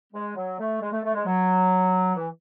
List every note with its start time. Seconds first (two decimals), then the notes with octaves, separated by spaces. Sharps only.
0.13 G#3
0.36 F#3
0.58 A3
0.81 G#3
0.91 A3
1.03 A3
1.14 G#3
1.25 F#3
2.15 E3